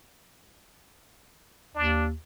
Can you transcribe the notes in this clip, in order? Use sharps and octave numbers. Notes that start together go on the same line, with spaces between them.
D#2 D4